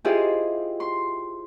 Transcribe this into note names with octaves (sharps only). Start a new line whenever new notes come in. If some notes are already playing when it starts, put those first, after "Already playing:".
E4 F4 G4 G#4 C5 D#5
C6